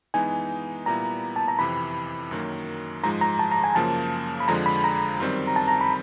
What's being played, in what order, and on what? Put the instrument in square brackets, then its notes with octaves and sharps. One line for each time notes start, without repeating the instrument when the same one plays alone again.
[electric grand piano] E3 G#3 B3 D#4 [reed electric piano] G#5
[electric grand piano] A#2 G3 B3 E4 [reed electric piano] A#5
[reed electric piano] A5
A#5
[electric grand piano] F2 C3 E3 [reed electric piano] B5
[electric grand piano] F#2 D#3 F#3 A#3
[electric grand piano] G#2 F3 G#3 [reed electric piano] A#5
[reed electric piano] A#5
A5
A#5
G#5
[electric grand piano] F#2 C#3 F3 A#3 [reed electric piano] A5
[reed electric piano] B5
[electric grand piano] F2 D3 F3 G#3 [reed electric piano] A#5
[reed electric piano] B5
A#5
[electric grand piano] F#2 D#3 G3 C4
[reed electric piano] A#5
A5
A#5
B5